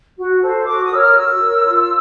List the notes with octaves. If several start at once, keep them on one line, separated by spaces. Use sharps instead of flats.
F#4
A4 C5
F#4 D6
D#6
A#4 C#5 E6 F6
F#4 E6
A#4 C#5
F4